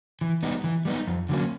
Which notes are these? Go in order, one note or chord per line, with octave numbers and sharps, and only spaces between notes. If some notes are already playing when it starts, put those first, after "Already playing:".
E3
G3 B3 D#4
E3
G3 B3 D#4
F2
D3 F#3 A#3 C#4